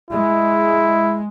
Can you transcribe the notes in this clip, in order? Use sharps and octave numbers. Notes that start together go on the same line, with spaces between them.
G#3 E4